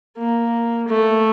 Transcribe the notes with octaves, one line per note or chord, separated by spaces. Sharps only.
A#3
A3